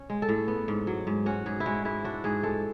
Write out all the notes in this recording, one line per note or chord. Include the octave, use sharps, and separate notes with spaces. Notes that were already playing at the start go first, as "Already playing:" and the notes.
Already playing: C#4
G#3
A4
A2
B3
G#2
F#3
G#2
C#4 F#4
G#2 G#4
E4
G#3 F#4
G#2 E4
D4 F#4
G#2 G#4
G#3 A4